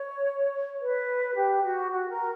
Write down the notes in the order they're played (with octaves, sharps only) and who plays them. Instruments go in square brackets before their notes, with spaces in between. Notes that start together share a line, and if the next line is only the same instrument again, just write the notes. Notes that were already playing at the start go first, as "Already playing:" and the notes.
Already playing: [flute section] C#5
B4
G4
F#4
F#4
A#4